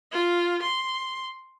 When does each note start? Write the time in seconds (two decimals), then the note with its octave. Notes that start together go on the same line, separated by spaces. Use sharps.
0.12 F4
0.62 C6